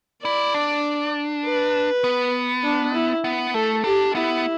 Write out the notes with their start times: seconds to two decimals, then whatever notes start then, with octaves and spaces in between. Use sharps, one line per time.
0.24 E4 D5
0.54 D4
1.45 B4
2.04 B3
2.64 D4
2.94 E4
3.24 B3
3.54 A3 A4
3.84 D4 G4
4.15 B3 E4